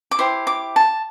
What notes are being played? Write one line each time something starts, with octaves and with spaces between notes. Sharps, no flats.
D6
E4 G4 C5 C6
D6
A5